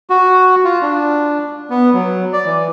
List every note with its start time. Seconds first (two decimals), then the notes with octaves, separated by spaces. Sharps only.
0.10 F#4
0.65 F4
0.82 D4
1.70 B3
1.93 F#3
2.33 D5
2.45 E3